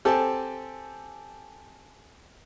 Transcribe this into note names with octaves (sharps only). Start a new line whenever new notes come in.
C4 G4 A4 G#5 A5